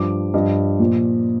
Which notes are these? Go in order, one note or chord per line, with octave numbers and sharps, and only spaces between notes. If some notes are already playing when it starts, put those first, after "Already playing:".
Already playing: G2 F3 D6
G2 F3 D#5
A#2 F3